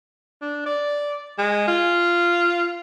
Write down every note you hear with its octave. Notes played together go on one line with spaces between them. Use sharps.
D4
D5
G#3
F4